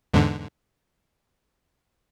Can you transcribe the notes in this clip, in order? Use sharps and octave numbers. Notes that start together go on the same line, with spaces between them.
E2 G#2 D3